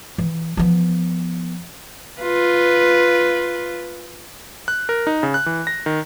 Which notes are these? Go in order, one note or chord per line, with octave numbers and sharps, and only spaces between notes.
E3
F3 B3
F4 B4
F#6
A#4
D#4
C#3
F#6
E3
A#6
D#3